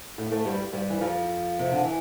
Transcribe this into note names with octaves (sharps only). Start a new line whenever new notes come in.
A2 A3
A2 A3
G2 G3
G2 G3
E3
F2 F3
C3
D3
E3